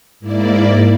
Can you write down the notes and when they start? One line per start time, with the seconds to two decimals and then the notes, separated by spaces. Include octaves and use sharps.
0.20 G#2 A#3 E4 D5